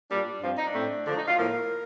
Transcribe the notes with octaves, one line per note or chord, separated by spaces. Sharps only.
A#2 G3 A#3 D4
G2 F3 C4 F4
D#4
D4
A2 A3 C4
D3 F3 A3 D4
D#4
F4
A2 F3 A#3 A#4